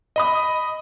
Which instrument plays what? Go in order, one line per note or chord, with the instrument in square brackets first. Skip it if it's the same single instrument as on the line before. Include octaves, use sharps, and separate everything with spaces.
[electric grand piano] D#5 B5 D#6